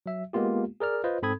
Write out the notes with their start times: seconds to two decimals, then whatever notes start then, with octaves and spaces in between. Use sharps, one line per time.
0.06 F#3 E5
0.33 G#3 A#3 B3 F4 G4
0.80 G#4 A#4 D5 F6
1.04 F4 B4 C5 D#5
1.22 G#2 C4 A4 B5 D#6 G#6